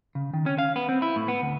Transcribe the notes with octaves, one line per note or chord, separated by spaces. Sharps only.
C#3
D#3
C#4
F5
B3
C4
E4
A2
B3
D2